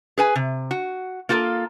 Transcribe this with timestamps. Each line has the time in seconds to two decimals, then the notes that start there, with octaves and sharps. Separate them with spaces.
0.18 G#4 B4 G#5
0.35 C3
0.71 F#4
1.29 A#3 F4 F#4 A4 A#4